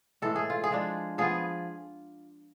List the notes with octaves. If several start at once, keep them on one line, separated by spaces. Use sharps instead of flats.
A2 E3 G#3 A4
G#4
F4
G#4
F3 G#3 D4
F3 B3 F4 G#4